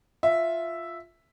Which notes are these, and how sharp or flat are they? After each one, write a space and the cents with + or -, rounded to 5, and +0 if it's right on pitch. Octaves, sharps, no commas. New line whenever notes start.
F4 +0 E5 +0